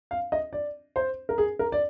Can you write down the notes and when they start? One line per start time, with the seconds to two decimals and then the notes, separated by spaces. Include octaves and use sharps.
0.11 F5
0.32 D#5
0.53 D5
0.96 C5
1.29 A#4
1.38 G#4
1.59 A#4
1.72 D5